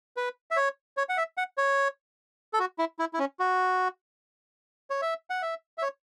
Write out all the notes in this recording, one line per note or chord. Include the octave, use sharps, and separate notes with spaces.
B4
E5
C#5
C#5
F#5
E5
F#5
C#5
A4
F#4
E4
E4
E4
C#4
F#4
C#5
E5
F#5
E5
E5
C#5